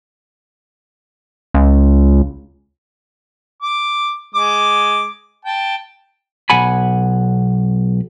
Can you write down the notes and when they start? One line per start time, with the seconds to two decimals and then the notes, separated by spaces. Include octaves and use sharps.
1.54 C#2
3.62 D6
4.35 G#3 D6
5.45 G5 A5
6.50 B1 F#5 G#5 B5